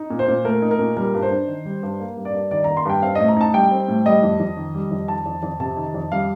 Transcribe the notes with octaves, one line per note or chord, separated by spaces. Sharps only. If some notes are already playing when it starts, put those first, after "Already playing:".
Already playing: D#4
A#2
C5
A#2
A3 A#4
D#4
A#4
A#2
G3 A#4
G2
C5
D4
D#3
G3
G2
A#3
G2
D5
G2
D#3 D5
A#3 A#5
C6
G2 G5
C4 F5
A2 D#5
A#5
D#4 A5
G3 G5
C4
A2
G3 D#5
F2
F2
D#3
G3
F2
D#3 A5
F2
F2
C3 A5
D#3
F2
G3 F5